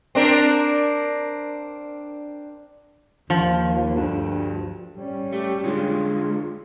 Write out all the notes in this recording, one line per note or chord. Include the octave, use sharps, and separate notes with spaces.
C4 D4 A#4
D#2 F3
D2 G2
G3 C#4
A3 G4
D3 G#3 F4